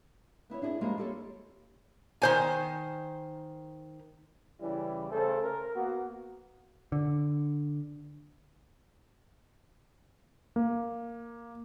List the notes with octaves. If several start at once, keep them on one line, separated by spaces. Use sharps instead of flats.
B3 E4 C5 C#5
D4 E4 G#4
F3 G3 G#3 A#3
G4 A4 C#5
D#3 C5 G#5
C#3 E3 G3 C#4 E4
C#3 A3 A4 C5
A#4
A#3 B3 F#4
D3
A#3